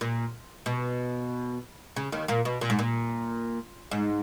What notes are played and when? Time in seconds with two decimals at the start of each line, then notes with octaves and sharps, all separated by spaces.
0.01 A#2
0.66 B2
1.96 C#3
2.12 D#2 D#3
2.28 A#2 A#3
2.45 B2
2.61 A#2
2.70 G#2
2.79 A#2
3.91 G#2